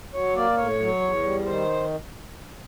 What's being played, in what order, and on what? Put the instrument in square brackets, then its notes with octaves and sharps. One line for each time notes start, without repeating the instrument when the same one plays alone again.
[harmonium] F#3 C#5
A#3 D5
A2 C#5
F#3
E2
G3
D#3 C5